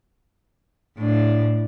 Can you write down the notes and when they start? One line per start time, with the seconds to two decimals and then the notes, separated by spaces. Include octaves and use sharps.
0.98 A2 D4